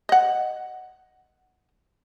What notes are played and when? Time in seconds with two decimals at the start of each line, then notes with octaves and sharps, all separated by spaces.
0.09 D#5 F#5